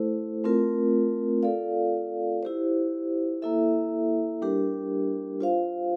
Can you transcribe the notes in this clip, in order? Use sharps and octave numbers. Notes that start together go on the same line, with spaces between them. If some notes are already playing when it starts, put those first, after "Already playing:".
Already playing: A3 E4 A4 C5
A3 C4 F4 A#4
F4 A4 D5 F5
E4 G4 C5
A#3 E4 A4 E5
G3 D4 G4 A#4
F4 C5 F5